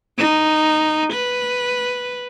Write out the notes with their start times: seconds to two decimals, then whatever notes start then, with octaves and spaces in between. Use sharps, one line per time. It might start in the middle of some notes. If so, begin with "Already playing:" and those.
0.18 D#4
1.13 B4